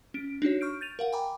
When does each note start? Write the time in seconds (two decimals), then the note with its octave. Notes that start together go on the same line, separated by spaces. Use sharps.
0.14 C#4 D7
0.42 D4 D#4 F#4 C#5
0.61 C#6 F6 G6 D7
0.81 G6 A6 D#7 F7
0.99 A#4 F5 F#5
1.13 G5 G#5 A#5 B5 D6